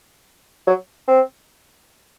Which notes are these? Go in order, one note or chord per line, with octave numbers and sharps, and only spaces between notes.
F#3
C4